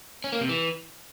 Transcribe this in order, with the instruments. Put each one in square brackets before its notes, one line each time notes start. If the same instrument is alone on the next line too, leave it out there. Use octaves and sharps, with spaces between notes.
[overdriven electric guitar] C#4
A#3
C3
E3